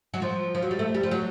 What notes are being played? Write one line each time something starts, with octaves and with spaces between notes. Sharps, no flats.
F#3
F3
F3
F#3
G3
A3
G3
F3
F#3